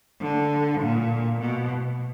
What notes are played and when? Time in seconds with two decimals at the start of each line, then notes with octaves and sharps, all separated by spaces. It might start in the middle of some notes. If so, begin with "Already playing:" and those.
0.21 D3
0.81 A#2
1.41 B2